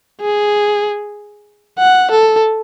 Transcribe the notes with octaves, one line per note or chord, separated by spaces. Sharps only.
G#4
F#5
A4